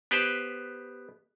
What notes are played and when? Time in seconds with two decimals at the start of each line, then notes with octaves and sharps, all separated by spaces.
0.11 B3 G4 B4 C5